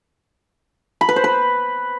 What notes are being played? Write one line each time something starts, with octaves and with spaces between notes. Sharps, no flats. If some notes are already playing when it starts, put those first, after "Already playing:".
B5
B4
C5
B4